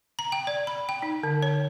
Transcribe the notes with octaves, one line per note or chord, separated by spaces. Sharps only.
A#5
G5
D5
B5
G5
D#4
D3
C#5